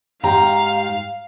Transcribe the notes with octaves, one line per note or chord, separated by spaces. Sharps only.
G#2 G4 F5 A#5